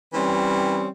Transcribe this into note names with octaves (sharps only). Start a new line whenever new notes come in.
E3 G3 C4 C#4